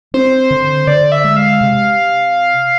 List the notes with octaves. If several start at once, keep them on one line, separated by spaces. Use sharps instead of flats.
C4 C5
D3
D3 D5
E5
G#3
F5
C3